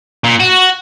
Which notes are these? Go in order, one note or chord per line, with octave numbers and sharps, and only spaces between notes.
A#2
F#4